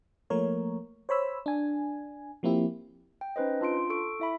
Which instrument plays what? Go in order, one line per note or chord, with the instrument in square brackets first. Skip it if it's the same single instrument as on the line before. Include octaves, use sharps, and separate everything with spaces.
[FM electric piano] F3 A3 A#3 A#4 C#5
C5 C#5 B5 E6
D4 G#5
F3 A#3 C4 E4 G4
[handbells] G5
C#4 D#4 B4 C5 D#5
D4 F4 C6 D7
A4 C#6 D7
E4 E5 B5